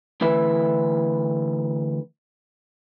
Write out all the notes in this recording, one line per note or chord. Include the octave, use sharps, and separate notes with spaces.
D2 E3 B4 E5